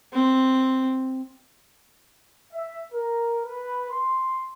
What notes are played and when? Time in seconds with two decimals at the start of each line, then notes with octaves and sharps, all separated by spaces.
0.12 C4
2.53 E5
2.93 A#4
3.44 B4
3.90 C6